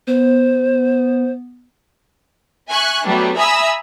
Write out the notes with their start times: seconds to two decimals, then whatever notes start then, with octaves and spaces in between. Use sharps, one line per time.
0.07 B3 C5
2.68 E5 G#5 C#6 F#6
3.05 F#3 G3 A3 B3 D4
3.36 E5 G#5 A#5 B5 D#6 E6